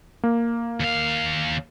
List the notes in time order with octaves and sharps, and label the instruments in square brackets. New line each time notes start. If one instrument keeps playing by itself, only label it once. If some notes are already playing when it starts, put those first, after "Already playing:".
[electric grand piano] A#3
[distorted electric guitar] D#2 F5